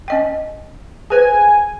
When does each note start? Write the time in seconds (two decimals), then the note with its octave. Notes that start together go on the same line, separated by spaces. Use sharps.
0.08 C#4 D#5 G5
1.10 G#4 B4 C5 G#5